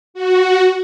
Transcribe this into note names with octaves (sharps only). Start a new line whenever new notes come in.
F#4